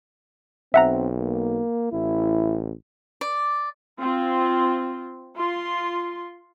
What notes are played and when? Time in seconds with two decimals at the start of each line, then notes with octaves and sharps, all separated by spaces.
0.74 B1 C4 E5 F#5 A#5
1.19 A#3
1.92 A1 E4
3.21 D5
4.00 C4 F4
5.35 F4 C6